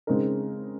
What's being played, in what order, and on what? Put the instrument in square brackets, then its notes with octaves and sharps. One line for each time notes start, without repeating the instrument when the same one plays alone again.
[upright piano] C#3 G#3 C4 D#4 A#4